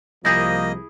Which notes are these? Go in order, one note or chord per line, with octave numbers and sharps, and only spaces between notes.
C2 F3 A#3 E4 G#4 D#5 G6 A#6